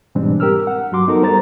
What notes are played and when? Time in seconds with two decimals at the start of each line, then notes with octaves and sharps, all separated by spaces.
0.15 G#2 B2 E3 G3 C4 D4
0.40 G4 A#4 E6 F6
0.67 F#5
0.92 G2 F#3 F#4 C6 D6
1.07 B3 D#4 F#4 A4 A#4
1.22 G3 C5 A#5 A6